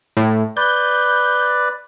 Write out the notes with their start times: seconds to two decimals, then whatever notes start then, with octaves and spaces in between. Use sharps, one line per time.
0.17 A2
0.57 B4 D5 G6